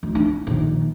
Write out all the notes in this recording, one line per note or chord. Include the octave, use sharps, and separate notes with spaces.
D2
D4
A#1 D#3